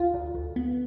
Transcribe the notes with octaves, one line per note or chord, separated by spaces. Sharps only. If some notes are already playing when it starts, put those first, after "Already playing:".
Already playing: D2 F4
D2
D2
B3